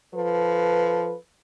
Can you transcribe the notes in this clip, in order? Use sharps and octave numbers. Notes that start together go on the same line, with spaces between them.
F3 A4 B4